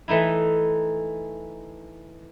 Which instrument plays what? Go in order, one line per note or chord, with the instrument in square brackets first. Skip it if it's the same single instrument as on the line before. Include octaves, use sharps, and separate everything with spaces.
[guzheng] E3 A3 D#4 E4